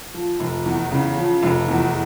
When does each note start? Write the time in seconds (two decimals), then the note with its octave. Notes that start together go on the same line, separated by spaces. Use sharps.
0.14 F3
0.40 F1
0.66 E2
0.91 C#3
1.17 F3
1.43 F1
1.68 E2